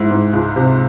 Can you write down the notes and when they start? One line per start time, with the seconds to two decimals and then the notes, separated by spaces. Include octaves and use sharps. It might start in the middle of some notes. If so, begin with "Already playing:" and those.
Already playing: G#2 E4
0.11 G#2
0.33 C#2
0.56 C3